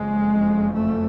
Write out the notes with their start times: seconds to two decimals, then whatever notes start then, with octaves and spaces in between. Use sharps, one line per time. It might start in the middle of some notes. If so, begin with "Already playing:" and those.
Already playing: F#1 F2 C#3 G#3
0.75 A3